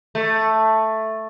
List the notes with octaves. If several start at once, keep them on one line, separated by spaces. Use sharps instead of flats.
A3